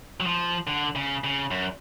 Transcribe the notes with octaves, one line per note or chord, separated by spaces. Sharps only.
F#3
F3
D3
C#3
C#3
F#2